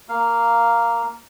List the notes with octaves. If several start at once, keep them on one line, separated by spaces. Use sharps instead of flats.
A#3 F5